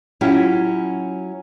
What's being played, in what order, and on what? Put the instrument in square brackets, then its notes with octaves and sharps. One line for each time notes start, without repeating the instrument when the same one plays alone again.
[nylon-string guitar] F#3 C#4 E4 F4 G4